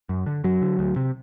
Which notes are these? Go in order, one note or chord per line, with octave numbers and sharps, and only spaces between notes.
F#2
D3
F#2 F#3
D3
D2
C3